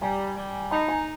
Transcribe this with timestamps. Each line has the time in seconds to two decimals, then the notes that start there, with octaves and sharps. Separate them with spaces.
0.01 G3 G#5 A#5
0.37 G3
0.71 D#4 A5 B5
0.88 G#5 A#5